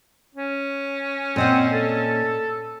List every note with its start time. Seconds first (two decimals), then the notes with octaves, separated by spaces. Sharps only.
0.35 C#4
1.36 A#2 C4 D#5 F#5
1.73 A4